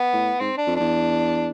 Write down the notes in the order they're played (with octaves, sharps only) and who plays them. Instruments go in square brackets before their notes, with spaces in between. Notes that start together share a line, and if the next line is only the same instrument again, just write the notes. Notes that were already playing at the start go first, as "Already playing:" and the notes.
Already playing: [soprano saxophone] B3
[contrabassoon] A2
[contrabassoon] G#2 [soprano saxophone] C4
[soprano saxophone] D4
[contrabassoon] F2
[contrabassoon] E2 [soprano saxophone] D4